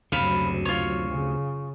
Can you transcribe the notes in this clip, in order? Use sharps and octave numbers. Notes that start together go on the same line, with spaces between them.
F#1 D2 C3 F#3 F5 B5
F4 C#5
C#3